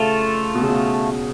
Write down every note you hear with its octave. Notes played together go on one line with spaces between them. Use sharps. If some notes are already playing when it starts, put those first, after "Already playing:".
Already playing: C#3 A3 F4 A4
B2
C#3
B2